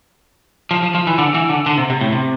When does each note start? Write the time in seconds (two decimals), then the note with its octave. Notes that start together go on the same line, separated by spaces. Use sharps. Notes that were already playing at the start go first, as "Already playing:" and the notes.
0.71 F3
0.83 F3
0.95 F3
1.07 E3
1.18 D3
1.34 E3
1.50 D3
1.66 D3
1.78 C3
1.90 C3
2.01 A2
2.12 C3